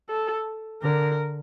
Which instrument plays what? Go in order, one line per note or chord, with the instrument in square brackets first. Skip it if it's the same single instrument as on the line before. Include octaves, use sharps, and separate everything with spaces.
[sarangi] A4
[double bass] D3 [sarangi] A#4